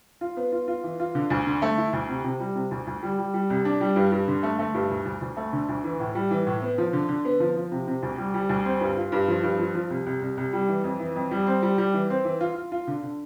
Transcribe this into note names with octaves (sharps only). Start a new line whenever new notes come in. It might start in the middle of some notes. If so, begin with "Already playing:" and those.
F4
B3
F4
F4
E3
F4
D3
D2
D3
A3
E4
D2
C3
C3
G3
C3
D2
D2
G3
G3
G3
C2
D4
G3
G2
G2
D3
A3
A3
G2
D2
D2
D2
A3
D3
D2
E3
A2
G3
E3
A2
B3
F3
D3
D3
B3
F3
F3
C3
C3
D2
G3
G3
D2
C4
G2
F4
G2
F3
G2
F3
F3
C2
C2
C2
C2
G3
E3
F2
E3
F2
G3
C4
G3
G3
E3
C4
E3
F4
F4
F4
D3
D3